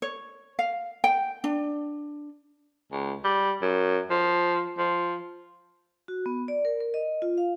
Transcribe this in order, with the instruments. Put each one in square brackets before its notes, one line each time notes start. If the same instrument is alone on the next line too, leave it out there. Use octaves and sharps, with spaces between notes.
[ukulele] C#5
F5
G5
D4
[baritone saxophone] C#2
G3
F#2
F3
F3
[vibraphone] F#4
B3
D5
A#4
A#4
D#5
F4
F5